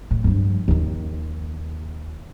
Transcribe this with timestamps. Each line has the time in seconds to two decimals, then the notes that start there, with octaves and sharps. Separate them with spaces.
0.11 A2
0.24 G2 F3
0.68 D#2 D#3